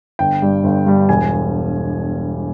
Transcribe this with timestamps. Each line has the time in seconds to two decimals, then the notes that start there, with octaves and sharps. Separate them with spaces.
0.19 G1 G5
0.42 G2 G3
0.64 G1
0.86 G2 G3
1.09 E1 G#5